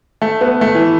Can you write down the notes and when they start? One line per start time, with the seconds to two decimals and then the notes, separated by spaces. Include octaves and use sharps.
0.22 A3
0.41 B3
0.61 A3
0.75 E3